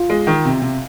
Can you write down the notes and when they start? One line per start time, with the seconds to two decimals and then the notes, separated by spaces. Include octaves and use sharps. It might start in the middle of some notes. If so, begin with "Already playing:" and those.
Already playing: F4
0.10 G#3
0.27 D#3
0.45 C3
0.62 C3